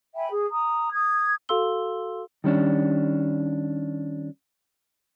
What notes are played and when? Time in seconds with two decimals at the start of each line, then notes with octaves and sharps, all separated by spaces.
0.15 E5 G5 G#5 B5
0.30 G#4
0.50 A#5 D#6
0.92 D#6 G#6
1.49 F#4 A4 F5 C6 E6 G7
2.44 D#3 G3 C#4 D4